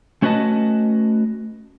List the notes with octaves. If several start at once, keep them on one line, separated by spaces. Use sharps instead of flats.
A3 C#4 F#4 B4 D#5 A5